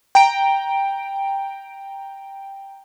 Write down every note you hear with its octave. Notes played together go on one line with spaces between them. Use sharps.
G5 A#5 D7